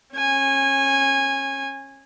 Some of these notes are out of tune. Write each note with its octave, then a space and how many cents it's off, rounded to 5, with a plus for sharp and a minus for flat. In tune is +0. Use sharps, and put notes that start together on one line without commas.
C#4 -30 G#5 -15